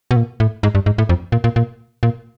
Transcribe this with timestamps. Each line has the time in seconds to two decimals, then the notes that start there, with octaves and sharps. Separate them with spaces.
0.11 B2
0.16 A#2
0.40 A2
0.63 G#2
0.75 G2
0.86 G#2
0.98 A2
1.09 F2
1.32 A#2
1.44 A#2
1.56 A#2
2.03 A#2